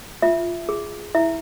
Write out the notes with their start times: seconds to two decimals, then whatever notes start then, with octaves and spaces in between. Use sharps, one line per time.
0.22 F4 E5
0.69 G#4
1.15 E4 E5